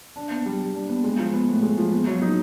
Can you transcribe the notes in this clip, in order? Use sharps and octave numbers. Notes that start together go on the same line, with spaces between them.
D4
B3
G3
G3
D4
B3
G#3
F3
B3
A2
G#3
F3
B3
F#3
D#4